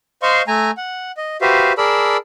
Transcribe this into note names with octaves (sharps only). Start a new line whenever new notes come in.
C5 D#5 F5 C6 C#6
A3 G#5 A#5
F#5
D#5
F#4 G4 B4 C5 E5 F5
G#4 A#4 D5 A5 B5 E6